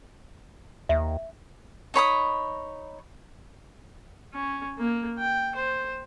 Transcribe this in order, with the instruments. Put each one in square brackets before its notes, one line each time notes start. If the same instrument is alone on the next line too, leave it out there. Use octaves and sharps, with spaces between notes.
[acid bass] D#2 [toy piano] E5
[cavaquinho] D#4 C#5 B5 D#6
[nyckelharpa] C#4
A#3
G5
C5